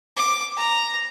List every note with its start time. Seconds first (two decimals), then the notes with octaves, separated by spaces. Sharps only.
0.16 D6
0.57 A#5